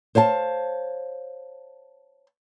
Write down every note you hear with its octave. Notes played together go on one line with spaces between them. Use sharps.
C5 C#5 F5 A5